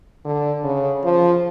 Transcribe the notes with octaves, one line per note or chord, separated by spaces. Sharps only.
D3
C#3
F3